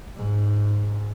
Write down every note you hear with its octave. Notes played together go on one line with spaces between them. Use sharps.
G#2